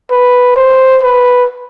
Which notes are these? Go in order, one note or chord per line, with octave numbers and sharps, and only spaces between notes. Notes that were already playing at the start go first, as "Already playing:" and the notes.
B4
C5
B4